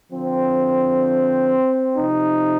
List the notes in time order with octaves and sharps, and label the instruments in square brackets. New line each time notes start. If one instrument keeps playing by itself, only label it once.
[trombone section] D3 F3 C4
C3 F3 D#4